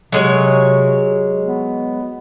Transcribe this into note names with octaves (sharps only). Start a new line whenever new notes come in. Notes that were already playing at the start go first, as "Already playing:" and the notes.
C3 F#3 G#3 C#5
B3